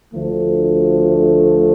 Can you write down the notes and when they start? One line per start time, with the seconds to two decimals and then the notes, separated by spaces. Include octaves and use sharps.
0.13 D2 D3 F3 A3